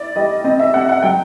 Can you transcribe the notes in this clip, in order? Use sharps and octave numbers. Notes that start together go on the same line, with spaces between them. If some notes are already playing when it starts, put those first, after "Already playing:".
Already playing: E4 D5
G3 D#5
C4 D#5
E5
C4 F#5
F#5
F#3 G5